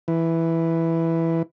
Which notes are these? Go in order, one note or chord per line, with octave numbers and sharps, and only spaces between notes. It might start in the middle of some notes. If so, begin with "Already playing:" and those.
E3